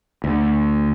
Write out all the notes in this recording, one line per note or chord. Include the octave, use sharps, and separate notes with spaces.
D2